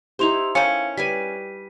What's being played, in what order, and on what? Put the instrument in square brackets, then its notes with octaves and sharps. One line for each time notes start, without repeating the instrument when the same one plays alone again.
[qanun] D#4 E4 C5 [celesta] G4 C6 F7
[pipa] D#3 A3 C#4 [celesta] F5 C#7 [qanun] G#5
[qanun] G3 B4 G#5 [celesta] B6 D#7